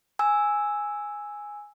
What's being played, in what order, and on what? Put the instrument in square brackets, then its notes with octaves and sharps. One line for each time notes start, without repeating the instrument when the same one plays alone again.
[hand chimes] G#5 E6